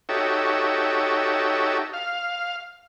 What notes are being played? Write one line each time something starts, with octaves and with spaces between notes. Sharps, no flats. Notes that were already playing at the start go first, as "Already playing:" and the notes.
D#4 F#4 G4 A4 C#5 E5
F5